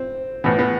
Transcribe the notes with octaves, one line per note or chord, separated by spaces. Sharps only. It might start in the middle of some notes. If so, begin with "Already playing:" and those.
Already playing: C4
A2 E3 B3
B3